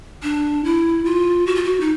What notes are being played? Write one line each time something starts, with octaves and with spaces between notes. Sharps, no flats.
D4
E4
F4
F#4
F4
F#4
D#4